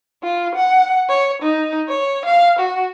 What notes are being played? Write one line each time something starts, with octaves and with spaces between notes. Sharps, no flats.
F4
F#5
C#5
D#4
C#5
F5
F#4